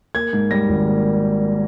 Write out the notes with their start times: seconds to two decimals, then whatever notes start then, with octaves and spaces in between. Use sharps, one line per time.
0.15 A#3 G#6
0.33 G#2
0.51 G3 A#6
0.69 G#1
0.87 A#3